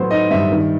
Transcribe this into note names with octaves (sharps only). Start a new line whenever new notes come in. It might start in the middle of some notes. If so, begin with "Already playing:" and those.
Already playing: A2 F#3 B3 C5
D#4 D#5
G2 E5
D#3